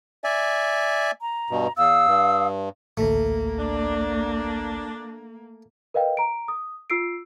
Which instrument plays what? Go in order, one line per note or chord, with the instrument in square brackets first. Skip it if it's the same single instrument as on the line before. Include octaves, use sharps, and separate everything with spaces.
[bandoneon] D5 E5 G#5
[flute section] A#5
[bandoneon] G2 B2
[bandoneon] E2 [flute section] F5 D#6 E6
[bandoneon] G2
[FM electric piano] A1 D2 [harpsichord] A3 [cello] A#3
[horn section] D4
[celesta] A#4 B4 D#5 F5 G5
A#5 D7
D#6
F4 E6 C7 D7